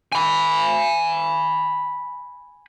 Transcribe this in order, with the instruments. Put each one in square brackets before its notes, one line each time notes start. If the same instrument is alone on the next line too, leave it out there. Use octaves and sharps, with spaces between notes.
[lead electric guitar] G#5 B5